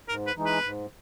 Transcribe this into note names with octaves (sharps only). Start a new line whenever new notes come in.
G#2 A#4
B4
E3 G#3 D#4
B4
G#2